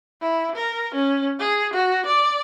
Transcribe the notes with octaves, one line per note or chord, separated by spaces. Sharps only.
E4
A#4
C#4
G#4
F#4
D5